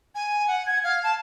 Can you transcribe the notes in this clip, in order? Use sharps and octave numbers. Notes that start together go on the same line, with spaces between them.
G#5
F#5
G#6
F5
A5